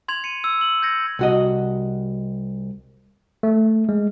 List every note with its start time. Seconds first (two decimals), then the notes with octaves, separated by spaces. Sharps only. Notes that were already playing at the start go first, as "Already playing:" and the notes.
0.08 C6 G#6 F7
0.24 C#7 D#7
0.43 E6 G#6
0.61 F#7
0.82 G6 G#6 A#6 C#7
1.19 C2 F#4 D#5
3.43 A3
3.89 G#3